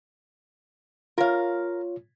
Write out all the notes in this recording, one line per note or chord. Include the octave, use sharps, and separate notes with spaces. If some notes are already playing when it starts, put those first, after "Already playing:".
F4 A#4 C#5 F5